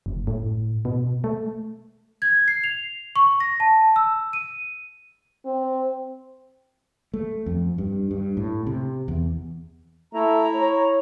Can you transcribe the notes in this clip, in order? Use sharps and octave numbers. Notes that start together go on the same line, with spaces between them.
F#1
A2
B2
A3
G#6
C7
F7
C#6
A#6
A5
E6
D#7
C4
A3
F2
G2
G2
A2
C3
E2
A3 E4 A#5
C#5